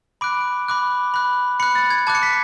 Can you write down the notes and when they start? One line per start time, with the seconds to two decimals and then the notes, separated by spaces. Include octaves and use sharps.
0.21 B5 D6 F#6 D7
0.68 B5 D6 F#6
1.14 B5 F#6
1.60 B5 F#6 C#7
1.75 A6
1.90 G#6
2.07 A5 D6 F#6 G#6
2.15 C#7
2.23 B6